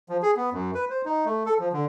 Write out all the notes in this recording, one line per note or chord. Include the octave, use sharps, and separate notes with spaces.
F3
G#4
B3
F#2
B4
C5
D#4
A3
A4
F3
D3